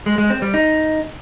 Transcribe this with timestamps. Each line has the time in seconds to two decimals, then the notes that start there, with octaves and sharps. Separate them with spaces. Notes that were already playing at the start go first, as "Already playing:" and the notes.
0.06 G#3
0.18 G#3
0.30 C4
0.42 G3
0.54 D#4